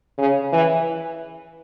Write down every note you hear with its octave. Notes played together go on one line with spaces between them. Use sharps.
C#3
E3